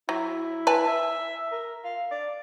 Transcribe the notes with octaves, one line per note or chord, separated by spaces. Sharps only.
F#3 E4
B4 G#5 A5
E5
A#4
F5
D5